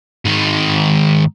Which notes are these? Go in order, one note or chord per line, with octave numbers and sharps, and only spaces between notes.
G#2 D#3